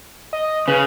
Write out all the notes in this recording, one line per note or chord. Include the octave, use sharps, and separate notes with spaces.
D#5
C#3 B4